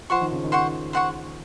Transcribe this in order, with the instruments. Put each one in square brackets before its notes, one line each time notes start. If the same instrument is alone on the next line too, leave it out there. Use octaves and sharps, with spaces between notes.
[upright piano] F3 [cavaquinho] C5 F#5 C#6
[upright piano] D#3
C#3
D#3
[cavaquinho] C5 F#5 C#6
C5 F#5 C#6